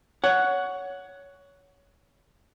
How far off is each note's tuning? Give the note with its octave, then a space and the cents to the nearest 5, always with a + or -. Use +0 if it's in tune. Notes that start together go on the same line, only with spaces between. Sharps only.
C#5 +15 F#5 -5